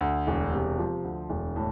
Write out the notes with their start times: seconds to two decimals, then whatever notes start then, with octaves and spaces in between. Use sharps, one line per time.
0.01 D2
0.27 E1
0.53 C3
0.78 F3
1.04 D2
1.30 E1
1.56 A2